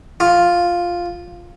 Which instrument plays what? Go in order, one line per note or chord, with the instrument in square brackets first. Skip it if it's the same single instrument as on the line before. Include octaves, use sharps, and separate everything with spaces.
[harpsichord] F4